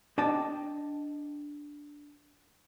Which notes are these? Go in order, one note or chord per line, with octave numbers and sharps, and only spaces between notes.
D4 D#5 G5 A5